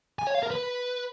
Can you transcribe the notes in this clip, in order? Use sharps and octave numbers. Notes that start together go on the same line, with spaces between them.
G#5
C#5
F5
A#4
B4